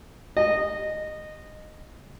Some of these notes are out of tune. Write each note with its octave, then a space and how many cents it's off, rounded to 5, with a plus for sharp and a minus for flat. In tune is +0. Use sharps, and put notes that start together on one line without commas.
D#5 -15